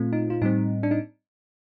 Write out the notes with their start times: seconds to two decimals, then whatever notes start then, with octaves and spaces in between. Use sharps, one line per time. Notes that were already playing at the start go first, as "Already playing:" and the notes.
Already playing: A#2 A3 C4 F4
0.13 D#4
0.30 F4
0.42 A2 G3 C4 D#4
0.83 D4
0.91 D#4